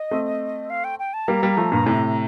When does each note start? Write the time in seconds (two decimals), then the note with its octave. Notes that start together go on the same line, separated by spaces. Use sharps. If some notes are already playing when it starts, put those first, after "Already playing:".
Already playing: D#5
0.11 A3 C4
0.70 F5
0.84 G5
0.99 G5
1.14 A5
1.28 G3 A#3 A#5
1.42 G3 A#3
1.57 F3 A3
1.72 G2 A#2
1.86 A2 C3